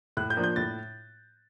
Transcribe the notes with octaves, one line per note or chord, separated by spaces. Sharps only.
A2 F#6
G6
F3 A#3 D4
G6
A2 A6